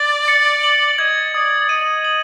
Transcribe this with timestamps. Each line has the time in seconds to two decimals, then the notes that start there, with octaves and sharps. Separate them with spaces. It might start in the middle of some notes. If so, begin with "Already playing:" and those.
Already playing: D5 A6
0.28 C#7
0.63 F#7
0.98 D#5 G#6
1.34 D5 D#6
1.69 D#5 D#7
2.05 F#7